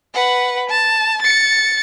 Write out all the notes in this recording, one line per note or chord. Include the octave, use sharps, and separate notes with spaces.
B4 F#5
A5
A6 C#7